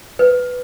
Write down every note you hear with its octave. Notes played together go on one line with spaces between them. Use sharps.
B4